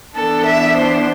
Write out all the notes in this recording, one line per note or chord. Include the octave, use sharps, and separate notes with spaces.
E3 B3 D4 A4
E5
C5